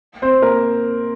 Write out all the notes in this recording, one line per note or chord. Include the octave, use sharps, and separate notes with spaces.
C4 C5
A#3 A#4